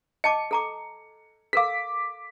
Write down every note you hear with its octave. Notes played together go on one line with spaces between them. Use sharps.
D#5 A5 D6 C#7
A4 A#5 D6
A4 A#4 F5 D6 B6